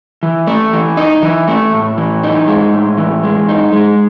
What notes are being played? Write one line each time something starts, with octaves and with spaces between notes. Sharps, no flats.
E3
A3
E3
D#4
E3
A3
A2
E3
D#4
G#3
A2
E3
G#3
D#4
G#3